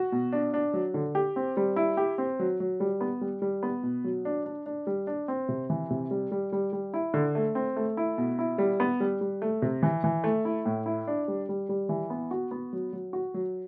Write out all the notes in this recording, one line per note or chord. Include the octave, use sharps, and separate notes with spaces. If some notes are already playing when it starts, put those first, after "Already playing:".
Already playing: F#4
B2
D4
D4
F#3
D3
G4
C4
G3
E4
G4
C4
F#3
F#3
G3
B3
G3
G3
B3
B2
F#3
D4
D4
D4
G3
D4
C4
C3
E3
C3
G3
G3
G3
G3
E4
D3
A3
C4
A3
E4
B2
E4
G3
B3
G3
G3
A3
C3
E3
E3
A3
E4
A2
E4
D4
G3
G3
G3
E3
B3
F#4
B3
F#3
F#3
F#4
F#3